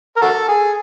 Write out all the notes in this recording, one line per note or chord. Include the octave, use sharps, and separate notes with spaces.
A#4
F#4 A4
G#4